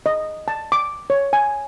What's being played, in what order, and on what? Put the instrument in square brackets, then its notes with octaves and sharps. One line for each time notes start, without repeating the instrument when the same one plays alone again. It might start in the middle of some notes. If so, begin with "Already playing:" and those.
[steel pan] D#5
A5
D6
C#5
G#5